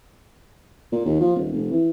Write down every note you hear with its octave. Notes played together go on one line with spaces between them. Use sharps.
A#2
D#2
F3
D#1
F1
E3